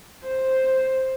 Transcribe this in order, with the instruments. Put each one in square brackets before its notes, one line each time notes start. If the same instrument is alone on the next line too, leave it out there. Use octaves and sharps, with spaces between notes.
[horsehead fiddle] C5